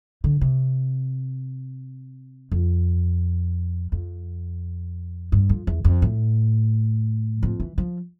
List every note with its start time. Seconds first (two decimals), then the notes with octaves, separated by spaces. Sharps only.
0.24 D3
0.41 C3
2.52 F2
3.92 F2
5.32 G2
5.49 F2
5.67 E2
5.84 F2
6.02 A2
7.43 F2
7.60 E3
7.78 F3